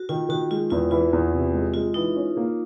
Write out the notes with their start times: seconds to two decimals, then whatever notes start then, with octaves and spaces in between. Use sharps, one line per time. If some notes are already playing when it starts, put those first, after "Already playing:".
Already playing: F#4
0.09 D#3 F4
0.29 D#3 F#4
0.51 G#3 F4
0.70 E2 F4
0.91 E3 F4
1.13 E2
1.33 C3
1.53 G#3
1.74 G#3 F4
1.94 E3 D#4
2.16 C#4
2.37 A#3